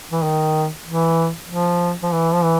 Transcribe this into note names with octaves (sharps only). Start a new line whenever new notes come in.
E3
D#3
E3
F3
F3
E3
F3
E3